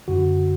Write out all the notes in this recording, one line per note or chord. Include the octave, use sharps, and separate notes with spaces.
F#2 D3 F#4